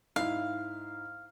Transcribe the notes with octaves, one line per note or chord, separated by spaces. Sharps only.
G#2 E4 F5